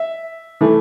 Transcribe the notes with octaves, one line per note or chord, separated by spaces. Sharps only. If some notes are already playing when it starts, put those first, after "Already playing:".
Already playing: E5
E3 A3